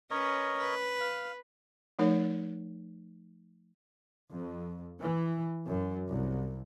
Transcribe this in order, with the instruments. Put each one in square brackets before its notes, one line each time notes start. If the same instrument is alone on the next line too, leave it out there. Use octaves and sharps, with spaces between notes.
[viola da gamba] C#4 B4 [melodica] A#4 C#5 D#5
[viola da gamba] B4
[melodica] F5
[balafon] F3 A3 D#4 A#4 C#5
[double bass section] F2
E3
F#2
C2